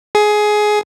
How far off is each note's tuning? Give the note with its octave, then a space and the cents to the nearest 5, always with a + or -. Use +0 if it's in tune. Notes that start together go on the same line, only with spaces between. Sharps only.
G#4 +15